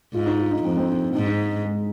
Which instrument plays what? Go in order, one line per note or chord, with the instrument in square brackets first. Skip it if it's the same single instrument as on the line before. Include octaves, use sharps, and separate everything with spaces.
[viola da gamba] G#2 [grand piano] F4
[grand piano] D#4
F4
D#4
[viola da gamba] F2 [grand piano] C4
[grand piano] C4
D#4
[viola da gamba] G#2 [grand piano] D#4
[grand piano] D#4
G#3